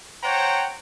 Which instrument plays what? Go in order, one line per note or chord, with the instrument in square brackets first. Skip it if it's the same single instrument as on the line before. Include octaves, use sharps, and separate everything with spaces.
[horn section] C5 C#5 F#5 G5 A#5